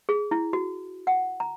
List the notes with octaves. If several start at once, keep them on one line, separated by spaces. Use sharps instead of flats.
G#4
E4
F#4
F#5
A#5